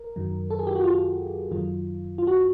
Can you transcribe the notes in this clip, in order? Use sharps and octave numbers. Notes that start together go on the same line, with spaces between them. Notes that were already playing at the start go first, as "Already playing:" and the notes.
Already playing: A#4
F#2 D#3 F#3
A4
G#4
G4
F#4
F4
F#2 D#3 F#3 F4
F4
F#4